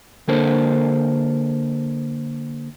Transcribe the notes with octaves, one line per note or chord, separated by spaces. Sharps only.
D3 A#3 D4 A4 A#4 C5